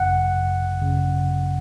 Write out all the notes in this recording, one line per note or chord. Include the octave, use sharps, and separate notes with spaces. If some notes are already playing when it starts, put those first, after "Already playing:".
Already playing: G#1 F#2 C#3 F#5
G#1 F#2 C#3